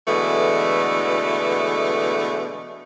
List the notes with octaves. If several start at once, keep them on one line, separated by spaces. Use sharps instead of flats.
B2 D3 E3 G#3 A3